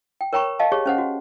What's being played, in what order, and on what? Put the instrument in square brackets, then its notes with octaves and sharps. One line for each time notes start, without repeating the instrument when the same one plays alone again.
[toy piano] G5
A#4 C#5 G5 A#5 B5 C#6
D#5 F5 A5
G4 G#4 C#5
C#4 C5 F#5
F#4